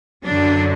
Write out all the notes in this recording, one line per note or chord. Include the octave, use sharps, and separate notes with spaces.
F#2 D3 F#3 D4